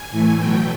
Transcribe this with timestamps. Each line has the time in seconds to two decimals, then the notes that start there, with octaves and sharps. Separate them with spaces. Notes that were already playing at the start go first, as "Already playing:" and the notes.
Already playing: G#5
0.11 A2 E3 A3
0.38 B2 F#3 A3 G5